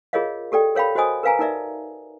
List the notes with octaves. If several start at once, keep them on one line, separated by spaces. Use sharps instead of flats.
F4 G#4 A#4 C#5 D#5 F5
G4 A4 D5 G5
A#4 C#5 F5 G5 B5
F#4 C5 C#5 D#5 G#5 D#6
A#4 B4 F5 G#5 A#5
D#4 A#4 D5 E5